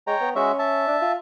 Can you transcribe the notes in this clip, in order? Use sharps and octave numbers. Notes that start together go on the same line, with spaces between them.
G#3 C#5 G5 A#5
B3
G#3 C#4 F#4 E5
E5 A5
D4
F4